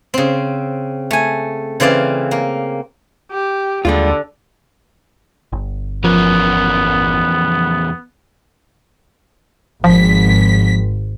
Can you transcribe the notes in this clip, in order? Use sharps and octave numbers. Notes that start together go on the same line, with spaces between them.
C#3 C4
A3 G#5
C#3 E3 C4 D5 F5
A#3
G4
D#2 D3 G3 G#3 F4
G1
E2 F3 B3 C#4 A#4
G#1 F3 B6